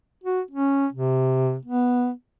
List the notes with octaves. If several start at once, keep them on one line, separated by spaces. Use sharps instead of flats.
F#4
C#4
C3
B3